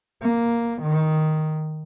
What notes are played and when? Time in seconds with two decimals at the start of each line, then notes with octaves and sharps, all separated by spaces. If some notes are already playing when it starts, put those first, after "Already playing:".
0.22 A#3
0.82 D#3